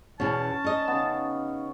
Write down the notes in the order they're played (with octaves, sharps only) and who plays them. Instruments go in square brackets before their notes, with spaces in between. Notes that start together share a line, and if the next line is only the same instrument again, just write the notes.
[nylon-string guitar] E2 B2 [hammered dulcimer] C#4 [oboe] A5
[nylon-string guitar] D#4 D#5
[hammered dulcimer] C#3 B3